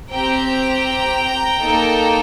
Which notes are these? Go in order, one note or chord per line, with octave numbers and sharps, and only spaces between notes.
C4 G4 G5 A#5
A#3 D#4 A4